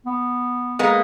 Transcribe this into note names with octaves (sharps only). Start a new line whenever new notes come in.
B3
G#3 A#3 B3